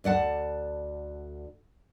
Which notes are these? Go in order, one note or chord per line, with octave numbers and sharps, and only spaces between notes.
D2 D5 F#5 A5